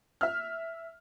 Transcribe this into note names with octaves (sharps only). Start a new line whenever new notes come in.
E5 F6